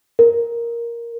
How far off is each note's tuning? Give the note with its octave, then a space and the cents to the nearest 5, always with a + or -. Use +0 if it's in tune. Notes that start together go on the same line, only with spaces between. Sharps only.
A#4 +5